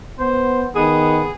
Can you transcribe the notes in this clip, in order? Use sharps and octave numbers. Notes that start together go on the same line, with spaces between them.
B3 C5
D#3 B3 G#4